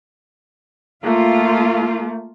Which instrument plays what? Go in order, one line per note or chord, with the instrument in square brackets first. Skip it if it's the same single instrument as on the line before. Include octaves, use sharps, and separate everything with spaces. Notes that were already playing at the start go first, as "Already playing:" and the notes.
[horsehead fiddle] A3 A#3 [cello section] F4